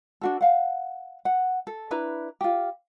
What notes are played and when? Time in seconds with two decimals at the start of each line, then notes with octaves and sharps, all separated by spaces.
0.21 D4 F#4 A4
0.41 F5 F#5
1.25 F#5
1.67 A4
1.91 D4 E4 B4 A#5
2.41 F4 G4